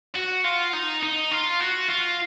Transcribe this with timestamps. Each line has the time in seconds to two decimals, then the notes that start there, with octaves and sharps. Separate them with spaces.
0.15 F#4
0.44 F4
0.73 D#4
1.03 D#4
1.32 F4
1.61 F#4
1.89 F4